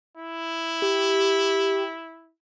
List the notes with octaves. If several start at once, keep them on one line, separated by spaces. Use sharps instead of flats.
E4
G4